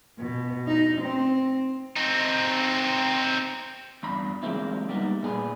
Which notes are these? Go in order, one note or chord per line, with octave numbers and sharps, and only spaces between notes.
B2
D#4
C4
C4 D#4
E2 G2 B5
E3 F#3 G#3 A#3 C4 E4
G3 A#3 B3 D#4
A#2 G#4 B4